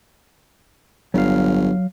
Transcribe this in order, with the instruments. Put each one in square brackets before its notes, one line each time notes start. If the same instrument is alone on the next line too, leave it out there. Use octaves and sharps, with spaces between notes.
[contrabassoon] G1 [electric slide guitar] F#3 F5